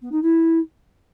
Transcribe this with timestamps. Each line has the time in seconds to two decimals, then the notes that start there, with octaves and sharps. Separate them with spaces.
0.01 B3
0.11 D#4
0.22 E4